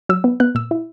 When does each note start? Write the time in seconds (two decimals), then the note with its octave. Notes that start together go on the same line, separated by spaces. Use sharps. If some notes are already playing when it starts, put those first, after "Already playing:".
0.09 F#3 E6
0.24 B3
0.40 B3 F#6
0.55 A#2 E6
0.71 E4